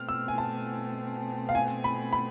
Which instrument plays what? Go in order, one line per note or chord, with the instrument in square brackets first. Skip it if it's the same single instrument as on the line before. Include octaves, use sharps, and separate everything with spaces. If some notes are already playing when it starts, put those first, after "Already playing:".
Already playing: [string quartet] B2 A3 C4 [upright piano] F6
[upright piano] E6
G#5
A5
F5
G#5
B5
B5